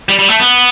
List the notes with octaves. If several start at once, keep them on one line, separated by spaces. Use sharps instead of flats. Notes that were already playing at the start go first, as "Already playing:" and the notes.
G3
G3
A3
B3